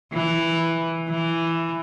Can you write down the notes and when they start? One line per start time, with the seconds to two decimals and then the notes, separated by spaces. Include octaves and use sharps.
0.13 E3
1.09 E3